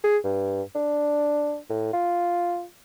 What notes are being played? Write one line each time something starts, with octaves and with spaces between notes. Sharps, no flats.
G#4
G2
D4
A2
F4